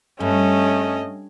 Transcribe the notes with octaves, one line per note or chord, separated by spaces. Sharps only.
G2 A3 C#4 D#5